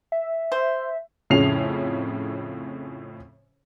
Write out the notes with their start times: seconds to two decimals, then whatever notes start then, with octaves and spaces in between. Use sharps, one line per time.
0.12 E5
0.52 C5
1.30 F2 A2 C#3 C#4 C7 F7